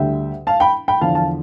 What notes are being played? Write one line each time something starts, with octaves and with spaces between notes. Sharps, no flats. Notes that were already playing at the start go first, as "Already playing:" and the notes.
Already playing: D2 D3 G3 E5 G5
F5 A5
G5 B5
G5 B5
E2 D3 F3 F5 A5
F5 A5